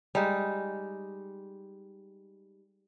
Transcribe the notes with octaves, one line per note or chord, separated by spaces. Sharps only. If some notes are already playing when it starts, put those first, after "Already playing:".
G3 G#3 D#4